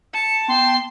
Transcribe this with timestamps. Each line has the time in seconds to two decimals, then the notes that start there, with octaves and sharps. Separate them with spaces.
0.14 A5 C#7
0.48 B3 G5 C6